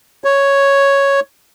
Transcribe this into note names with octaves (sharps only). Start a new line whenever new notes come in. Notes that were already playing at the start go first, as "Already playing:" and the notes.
C#5